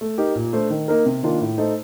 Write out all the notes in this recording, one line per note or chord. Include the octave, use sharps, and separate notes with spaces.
A3
D#4 G4 A#4
A#2
A3 D4 A4 C5
D#3
A#3 D#4 A#4
C3
D#3 A#3 D4 F4
A2
A3 D#4 A4 C5